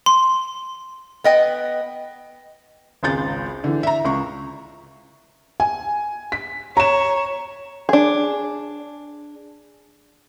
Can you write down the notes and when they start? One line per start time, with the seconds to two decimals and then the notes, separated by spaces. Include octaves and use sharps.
0.06 C6
1.24 B3 D#5 G5
3.03 G#1 C#2 G#4 G6 A6
3.64 D3 E3
3.83 E5 A#5
4.04 C#2 C#6
5.60 G#5
6.32 B6
6.77 C#5 A#5 E7
7.89 D4 G#4